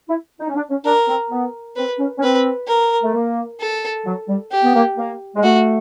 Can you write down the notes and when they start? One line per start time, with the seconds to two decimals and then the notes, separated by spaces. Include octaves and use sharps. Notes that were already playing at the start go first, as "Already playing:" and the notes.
0.09 E4
0.40 D#4
0.48 C#4
0.55 D4
0.70 C#4
0.85 D4 A#4
1.08 C4
1.30 B3
1.76 C4 B4
1.99 C#4
2.18 C#4
2.23 C4 B4
2.68 A#4
3.02 A3
3.13 A#3
3.60 A4
4.05 F#3
4.28 G3
4.51 G4
4.63 B3
4.74 A#3
4.97 A#3
5.35 G#3
5.43 A3 F#4